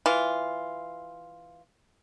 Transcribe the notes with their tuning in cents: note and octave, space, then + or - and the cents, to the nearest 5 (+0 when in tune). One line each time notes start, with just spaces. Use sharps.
E3 +0 F4 +0